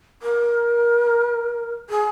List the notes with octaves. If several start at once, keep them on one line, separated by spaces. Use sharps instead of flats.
A#4
G#4